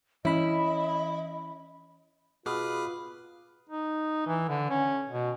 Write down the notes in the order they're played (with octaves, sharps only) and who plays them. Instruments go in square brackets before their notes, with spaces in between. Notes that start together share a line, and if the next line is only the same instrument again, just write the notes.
[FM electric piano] E3 B5 [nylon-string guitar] C#4 [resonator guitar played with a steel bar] E4 [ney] D#5
[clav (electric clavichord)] B2 [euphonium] F4 [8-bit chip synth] G#4 D6 F6 [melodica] B4
[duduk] D#4
E3
D3
C#4
B2